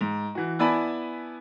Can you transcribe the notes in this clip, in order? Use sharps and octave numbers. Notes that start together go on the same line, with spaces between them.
G#2
E3 F#4
B3 E4 D5 G#5 A5 B5